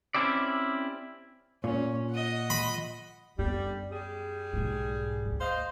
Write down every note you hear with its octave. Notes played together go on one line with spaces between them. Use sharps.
C4 C#4 E4 G4 D5
A#2 C#4
D#5 F#5
B5
F#2 D3 G3 B3
G3 G#4
B1 G#2
D2
C5 D#5 F5